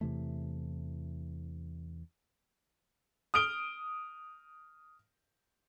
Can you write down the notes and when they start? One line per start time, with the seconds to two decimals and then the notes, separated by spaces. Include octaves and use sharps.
0.01 E2 C3 E3 A3
3.34 D#6 F6 D7 G7